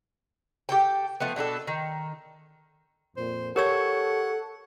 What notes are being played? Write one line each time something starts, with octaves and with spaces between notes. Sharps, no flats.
G4 A4 G5
F3 A3 B3
B2 D4 F#4 A4
D#3
F2 A#2 C5
G4 A4 A#4 C#5 F#5 C#6 E6 G#6